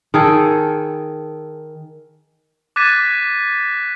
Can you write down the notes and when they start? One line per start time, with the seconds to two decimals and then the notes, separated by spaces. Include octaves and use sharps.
0.14 D#3 G#4 A4
2.76 D6 F#6 G#6 A6 B6 D#7